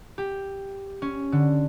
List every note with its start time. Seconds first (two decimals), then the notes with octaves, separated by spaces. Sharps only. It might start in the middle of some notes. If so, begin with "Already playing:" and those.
0.18 G4
1.02 C#4
1.32 D3